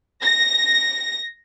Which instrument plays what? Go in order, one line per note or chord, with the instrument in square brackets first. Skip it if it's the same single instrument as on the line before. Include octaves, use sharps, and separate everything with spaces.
[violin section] A#6